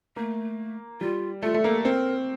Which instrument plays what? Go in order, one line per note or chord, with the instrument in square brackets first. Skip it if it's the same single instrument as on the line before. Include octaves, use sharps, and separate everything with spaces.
[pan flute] A3 [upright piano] A#3
[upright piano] G3 [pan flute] F4
[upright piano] A3 [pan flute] F4
[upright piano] A3
[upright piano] A#3 [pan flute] A4
[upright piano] C4 [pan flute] A#4